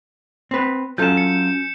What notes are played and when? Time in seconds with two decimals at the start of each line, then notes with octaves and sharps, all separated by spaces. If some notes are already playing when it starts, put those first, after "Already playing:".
0.51 C4 B4
0.98 F#3 C#4 F4 A4 G6 E7
1.17 C#7